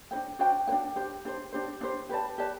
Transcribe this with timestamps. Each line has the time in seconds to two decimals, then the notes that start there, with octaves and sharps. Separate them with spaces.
0.11 D4 F#4 C5 G5
0.39 D4 F#4 C5 G5
0.67 D4 F#4 C5 G5
0.96 D4 G4 C5
1.25 D4 G4 C5
1.52 D4 G4 C5
1.81 D4 G4 C5
2.09 G4 B4 D5 A5
2.38 G4 B4 D5 A5